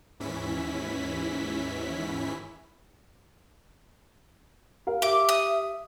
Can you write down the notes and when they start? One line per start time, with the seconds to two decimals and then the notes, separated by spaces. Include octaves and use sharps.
0.20 D#2 G#2 E3 C#4 E4 B6
4.87 A#4 F5
5.02 G4 E5 D6
5.29 D#6